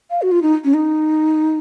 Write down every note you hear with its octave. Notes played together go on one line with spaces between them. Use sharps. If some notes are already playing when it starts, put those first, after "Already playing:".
F5
F#4
F4
D#4
C#4
D#4